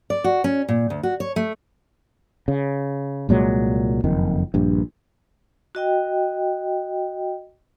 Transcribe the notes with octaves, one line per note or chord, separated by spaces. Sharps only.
D5
F#4
C#4
A#2
D2
F#4
C#5
A3
C#3
C2 A#2 F#3 G#3
F#1 F2 D#3
A#1 G2
F#4 D#5 G5